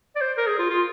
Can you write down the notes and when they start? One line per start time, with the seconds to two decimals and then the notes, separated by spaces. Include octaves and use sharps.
0.16 D5
0.21 C5
0.37 A#4
0.47 G#4
0.59 F4
0.70 F4